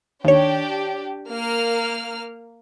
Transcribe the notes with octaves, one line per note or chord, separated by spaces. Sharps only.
D#2 D4 G4 C#5
A#3 F6